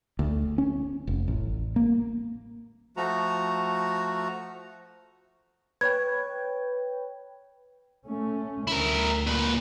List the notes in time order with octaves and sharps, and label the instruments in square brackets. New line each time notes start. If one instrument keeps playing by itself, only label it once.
[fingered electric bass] D2
C#4
F1
A1
A#3
[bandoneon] F3 A3 F#4 A#5
[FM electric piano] B4 C#5 G5 [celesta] G#6
[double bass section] A3 C#4
[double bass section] D2 [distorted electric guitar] E4 A#4
[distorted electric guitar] A#2 B4